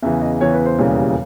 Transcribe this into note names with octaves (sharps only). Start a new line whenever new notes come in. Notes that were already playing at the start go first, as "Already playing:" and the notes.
E2 C#3 E3 E5
D#5
E2 C#3 E3 C#5
B4
C5
E1 D#2 C#3 E3 G3 C#5